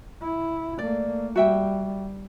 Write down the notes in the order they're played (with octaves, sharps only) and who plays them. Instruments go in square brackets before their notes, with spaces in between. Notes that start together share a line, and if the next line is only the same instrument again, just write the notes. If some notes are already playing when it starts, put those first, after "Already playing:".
[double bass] E4
[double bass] A3 A#3 [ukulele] D5
[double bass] G3 [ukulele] F#4 E5 G5